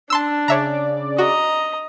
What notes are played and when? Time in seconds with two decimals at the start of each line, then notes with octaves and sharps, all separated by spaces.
0.10 D4 A5 C6 E6
0.48 C#3 C#5 D5 E5 A#5
1.18 F#4 D#5 A#5